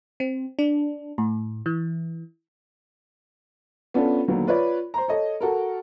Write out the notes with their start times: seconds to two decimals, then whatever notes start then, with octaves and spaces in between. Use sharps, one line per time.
0.20 C4
0.59 D4
1.18 A2
1.66 E3
3.94 B3 C#4 D4 F4 A4
4.28 D#2 D3 F#3 B3
4.47 F4 B4 C#5 D5
4.94 C5 A#5
5.08 A4 C#5 D#5
5.41 F#4 A4 A#4